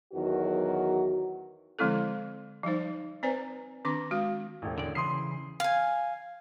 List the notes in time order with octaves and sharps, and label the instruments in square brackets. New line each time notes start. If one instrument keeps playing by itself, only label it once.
[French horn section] E2 D#3 F#3 F#4
[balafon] D3 F3 G#3 C4 E4 A4
F3 G3 D#4 C5
C4 B4 C5 D5 G#5 A#5
D#3 C4 D4 D6
G#3 F#4 F5
[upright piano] E1 A1
[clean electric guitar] D3 D5
[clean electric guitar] C#3 E3 [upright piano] C6 D#6 C7
[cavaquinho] F5 G#5